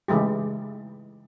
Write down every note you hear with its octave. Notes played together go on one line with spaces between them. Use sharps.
C#3 E3 G#3 A3 G4